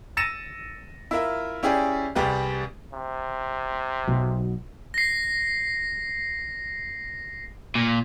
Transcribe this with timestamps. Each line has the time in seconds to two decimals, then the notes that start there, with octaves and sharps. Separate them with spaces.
0.17 E6 A6 A#6 C#7 D#7 E7
1.11 E4 F4 A#4 E5
1.63 C#4 E4 G4 G#4 D5
2.15 C2 G3 G4 G#4 B4
2.93 C3
4.07 B1 B2 F#3
4.94 A#6 C7
7.75 A#2